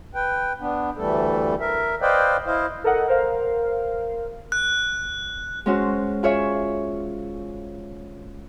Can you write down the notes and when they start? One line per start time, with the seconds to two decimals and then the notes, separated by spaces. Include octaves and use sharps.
0.15 B4 G5
0.60 B3 D4
0.97 D2 E3 G3 A3 A4
1.60 A#4 E5
2.02 B4 C5 D5 D#5 F5 G5
2.46 E4 C5 D#5 F5
2.84 A4 A#4 D#5 F#5
3.08 A#4 C5 F5
4.52 F#6
5.66 G#3 C#4 F#4 C5
6.23 F4 G#4 C#5 E5